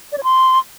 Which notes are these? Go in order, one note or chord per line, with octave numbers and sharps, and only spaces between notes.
D5
C#5
C6